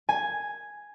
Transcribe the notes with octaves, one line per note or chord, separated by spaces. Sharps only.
G#5